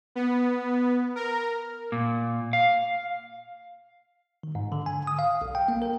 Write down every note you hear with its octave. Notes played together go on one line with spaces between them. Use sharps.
B3
A#4
A#2
F5
D#3
G#2
D3
G#5
D#6
F5
B1
G5
A#3
A#4